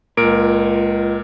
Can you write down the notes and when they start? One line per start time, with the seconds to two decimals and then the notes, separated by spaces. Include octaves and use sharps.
0.17 C#2 A#2 A#4 D7